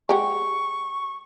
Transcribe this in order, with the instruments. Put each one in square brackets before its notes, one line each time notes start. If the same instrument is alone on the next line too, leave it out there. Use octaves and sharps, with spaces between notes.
[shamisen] G#3 G4 F#5 [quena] C#6